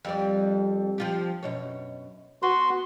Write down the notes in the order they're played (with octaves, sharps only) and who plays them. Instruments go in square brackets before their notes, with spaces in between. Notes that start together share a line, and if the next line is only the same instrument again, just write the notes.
[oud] F2 G3 D5
F3 F4 G4
F#2 B2 C#5
[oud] B3 [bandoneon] F#4 C6